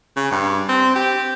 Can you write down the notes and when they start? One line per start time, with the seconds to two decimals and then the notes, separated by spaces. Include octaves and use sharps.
0.16 C#3
0.31 G2
0.69 C4
0.96 G4